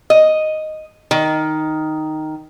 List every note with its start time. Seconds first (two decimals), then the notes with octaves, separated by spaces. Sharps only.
0.10 D#5
1.11 D#3